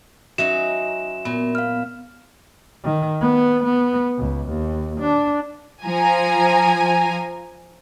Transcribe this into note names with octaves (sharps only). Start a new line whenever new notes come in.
F#3 C#4 D#4 F#4 E5 E7
A#2 B3
F5 F6
D#3
B3
B3
C#2
D#2
D4
F3 G#5 A#5